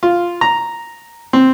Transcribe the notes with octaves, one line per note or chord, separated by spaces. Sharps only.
F4
A#5
C4